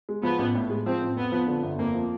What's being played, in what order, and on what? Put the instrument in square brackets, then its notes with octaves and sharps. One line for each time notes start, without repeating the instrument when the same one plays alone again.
[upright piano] G#3
[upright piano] F3 [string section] B3
[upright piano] A1
A2
G#3
[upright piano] F3 [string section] C4
[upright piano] A1
[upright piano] F2 [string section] B3
[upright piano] F3
D3
G1
[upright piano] F2 [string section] A#3
[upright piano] F3